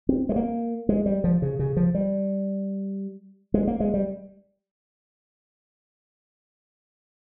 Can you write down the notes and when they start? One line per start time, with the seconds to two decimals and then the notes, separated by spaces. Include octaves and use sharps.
0.09 C4
0.29 G#3
0.36 A#3
0.89 G#3
1.06 G3
1.24 F3
1.42 C#3
1.59 C#3
1.77 F3
1.95 G3
3.54 G#3
3.67 A#3
3.80 G#3
3.94 G3